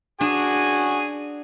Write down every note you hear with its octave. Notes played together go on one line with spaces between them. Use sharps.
D4 F#4 G#4 G#5